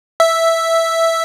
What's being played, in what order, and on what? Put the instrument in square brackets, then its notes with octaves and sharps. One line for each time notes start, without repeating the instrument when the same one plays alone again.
[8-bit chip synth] E5